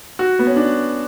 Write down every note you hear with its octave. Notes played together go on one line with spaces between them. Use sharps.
F#4
B3
C#4
D4